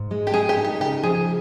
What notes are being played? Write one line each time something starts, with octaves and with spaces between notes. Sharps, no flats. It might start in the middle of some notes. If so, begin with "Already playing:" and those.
Already playing: G#2
G#3
G4
G#3 G#4
G4
D#4
G4
C#3 G4
F3 G#4